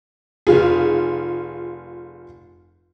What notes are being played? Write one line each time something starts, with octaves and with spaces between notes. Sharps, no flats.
F1 F4 G#4